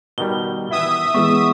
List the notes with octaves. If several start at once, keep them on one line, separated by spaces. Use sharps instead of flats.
B2 D#3 G3 G7
E3 B3 E4 E5 D#6
E3 G#3 B3 D5 C#6